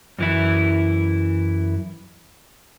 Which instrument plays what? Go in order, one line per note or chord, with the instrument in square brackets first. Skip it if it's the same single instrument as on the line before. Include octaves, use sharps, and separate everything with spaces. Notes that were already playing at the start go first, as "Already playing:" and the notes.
[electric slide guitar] F#2 E3 E4